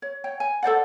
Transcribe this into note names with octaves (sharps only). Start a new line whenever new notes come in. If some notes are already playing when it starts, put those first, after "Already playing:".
C#5
C#5 G5
G#5
A4 C5 D5 F#5